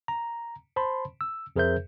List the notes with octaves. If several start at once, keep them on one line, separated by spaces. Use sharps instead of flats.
A#5
C5 A5 B5 C6
E6
F2 G#4 A#4 C5 E5 G6